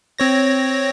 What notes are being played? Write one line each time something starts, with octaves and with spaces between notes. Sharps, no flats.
C4 C#5 A#6